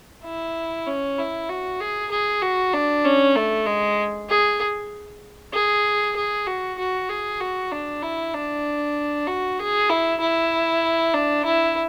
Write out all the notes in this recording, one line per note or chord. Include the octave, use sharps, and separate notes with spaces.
E4
C#4
E4
F#4
G#4
G#4
F#4
D4
C#4
A3
G#3
G#4
G#4
G#4
F#4
F#4
G#4
F#4
D4
E4
D4
F#4
G#4
E4
E4
D4
E4